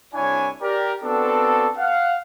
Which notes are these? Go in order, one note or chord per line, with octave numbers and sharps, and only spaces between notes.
C2 D4 E4 C#5 G#5
G4 A#4 D5
B3 C4 D4 F#4 A4
F5 F#5